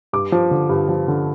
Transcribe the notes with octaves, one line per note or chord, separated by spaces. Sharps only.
G2 D6
F3
D3
G2
F3
D3